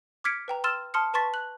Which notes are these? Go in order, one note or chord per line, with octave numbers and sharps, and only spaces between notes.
D6 F6 G#6 B6 C#7 D7
B4 G5 A#5
C6 E6 F6 A6 E7
A5 C6 D#6 F6 C#7
B4 A5 C6 C#6 A6 B6
F#6 F#7